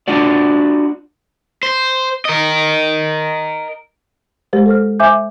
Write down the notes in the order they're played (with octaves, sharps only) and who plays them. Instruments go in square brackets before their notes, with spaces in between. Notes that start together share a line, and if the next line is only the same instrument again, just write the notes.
[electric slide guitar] D4 F4 F#4 D5
[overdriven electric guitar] C5
A#4 D#5
[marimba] G#3 G4 A#4 C5
A4 C5 F6
C5 E5 G#5 D6 G6